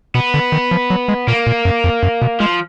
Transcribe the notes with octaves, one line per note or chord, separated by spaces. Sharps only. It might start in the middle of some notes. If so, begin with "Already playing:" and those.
B2 B3
D3
D#3
F3
F#3
G#3
A#2 A#3
A#2
F#2
F2
F#2
B2
F3 G#3